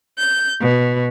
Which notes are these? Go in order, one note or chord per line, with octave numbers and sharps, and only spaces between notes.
G6
B2